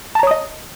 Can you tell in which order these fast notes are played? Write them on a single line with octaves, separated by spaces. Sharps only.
A5 A#5 C#5 D#6 D#5